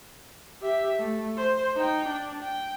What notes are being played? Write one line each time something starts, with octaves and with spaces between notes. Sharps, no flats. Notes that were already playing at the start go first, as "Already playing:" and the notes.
G4 E5
A3
C5
D#4 G5
D4
G5